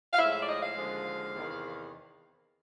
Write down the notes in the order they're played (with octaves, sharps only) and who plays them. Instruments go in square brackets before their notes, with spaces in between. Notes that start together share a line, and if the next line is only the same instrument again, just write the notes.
[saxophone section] F5
A2 F3 G#3 E5
E5
D5
D#5
F5
D#2 D3 F3 G#3
E2 C3 D#3